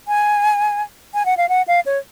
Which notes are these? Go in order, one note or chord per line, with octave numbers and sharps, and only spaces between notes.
G#5
G#5
F#5
F5
F#5
F5
C#5